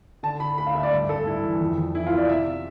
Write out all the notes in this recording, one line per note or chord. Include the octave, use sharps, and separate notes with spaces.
D3 A5
D3 B5
D2 B5
F5
D2 E5
D5
G2
G2 A4
G2 E4
E3
F2
F2
E3 E4
F4
B3
D5
C3 E5